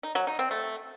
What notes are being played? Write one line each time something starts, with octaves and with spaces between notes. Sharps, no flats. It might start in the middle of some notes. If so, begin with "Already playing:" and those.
D#4
F#3
D#4
C4
A3